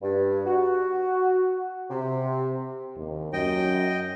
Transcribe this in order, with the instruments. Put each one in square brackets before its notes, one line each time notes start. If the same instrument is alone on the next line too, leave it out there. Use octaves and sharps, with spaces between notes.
[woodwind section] G2
F#4
C3
[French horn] D#2
[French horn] F#2 [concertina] D#5 G5